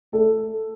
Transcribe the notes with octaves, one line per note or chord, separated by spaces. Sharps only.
A3 A4